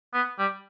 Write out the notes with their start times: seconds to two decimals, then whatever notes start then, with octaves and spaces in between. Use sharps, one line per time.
0.14 B3
0.39 G3